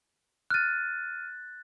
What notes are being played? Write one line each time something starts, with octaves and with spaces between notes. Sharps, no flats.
F6 F#6 A6 D#7